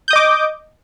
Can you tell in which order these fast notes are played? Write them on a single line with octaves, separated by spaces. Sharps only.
G6 D#6 D#5 D6